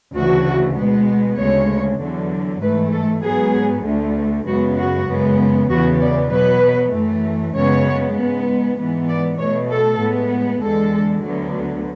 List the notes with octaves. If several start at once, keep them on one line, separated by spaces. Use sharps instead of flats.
D2 C#3 E3 A3 F#4
B2 G#3 B3
D2 C#3 G#3 C#5
E2 D3 F#3
G#2 E3 A3 B4
A4
G#2 F#3 B3 G#4
D2 D3 A3
F#2 C#3 G#3 B3 F#4
F#4
F#2 C#3 G#3 B3
E2 C#3 E3 B3 F#4
D5
B2 F#3 B3 B4
F#2 E3 A3
F#2 C#3 G#3 B3 C#5
G#2 G#3 B3
G#2 E3 B3
D5
B2 A3 C#5
A4
A2 G#3 B3
E2 D3 G#3 A4
D2 D3 F#3 B3